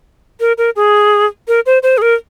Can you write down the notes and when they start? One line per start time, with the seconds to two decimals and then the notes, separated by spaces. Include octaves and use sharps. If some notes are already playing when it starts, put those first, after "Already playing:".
0.40 A#4
0.58 A#4
0.76 G#4
1.48 A#4
1.66 C5
1.83 C5
1.98 G#4
2.02 A#4